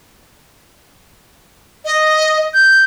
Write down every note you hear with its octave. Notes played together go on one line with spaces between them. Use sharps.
D#5
G6